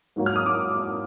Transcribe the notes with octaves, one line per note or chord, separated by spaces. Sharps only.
G#2 F#3 A#3
F6
D#6
D6